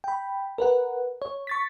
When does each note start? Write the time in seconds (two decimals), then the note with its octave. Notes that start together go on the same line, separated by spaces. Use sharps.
0.04 G5 B5
0.58 A#4 B4 F#5
1.22 C#5
1.47 C#6 A6 B6